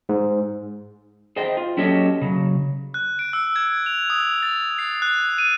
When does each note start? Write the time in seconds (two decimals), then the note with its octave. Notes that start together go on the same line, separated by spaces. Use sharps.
0.09 G#2
1.36 G#4 C5 D#5 G5
1.57 F4
1.77 F#3 C#4 G4 A4 C#5 D#5
2.21 C#3 F#3
2.94 F#6
3.19 D7
3.33 E6
3.56 G#6
3.86 F7
4.10 D#6
4.43 A6
4.79 C7
5.02 F#6
5.38 D#7